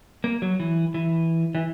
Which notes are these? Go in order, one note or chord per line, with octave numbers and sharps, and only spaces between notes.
A#3
F#3
E3
E3
E3